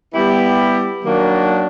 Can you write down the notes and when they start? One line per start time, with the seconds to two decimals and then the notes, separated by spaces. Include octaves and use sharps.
0.14 G3 B3 E4 G4
1.03 D#3 F#3 A#3 D4 F#4